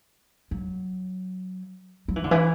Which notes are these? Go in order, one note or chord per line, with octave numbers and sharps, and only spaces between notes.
F#3
F#3
E3
D3
E3